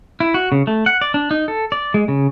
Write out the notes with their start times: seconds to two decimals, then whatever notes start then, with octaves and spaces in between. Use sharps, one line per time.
0.20 E4
0.34 F#4
0.52 C#3
0.67 A3
0.86 F#5
1.01 D5
1.14 D4
1.31 D#4
1.48 A4
1.72 D5
1.94 G#3
2.08 C#3